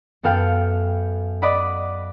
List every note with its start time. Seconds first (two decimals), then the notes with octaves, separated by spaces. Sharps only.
0.23 F#2 B3 A4 F5 G5 C#7
1.42 D5 D#5 F#5 B5